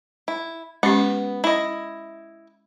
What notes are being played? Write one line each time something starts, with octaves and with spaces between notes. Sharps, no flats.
E4
G#3 B3 C#4 G4
E4 D#5 E5